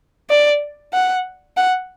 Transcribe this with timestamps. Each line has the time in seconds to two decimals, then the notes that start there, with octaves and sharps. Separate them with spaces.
0.30 D5
0.93 F#5
1.57 F#5